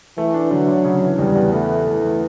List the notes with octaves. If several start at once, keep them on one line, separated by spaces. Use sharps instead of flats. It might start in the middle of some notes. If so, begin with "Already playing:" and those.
E3 A3
D4
D3 F#3
D3
C#3
E3
E2 G3
E2
A3 B3
E4
E3
E3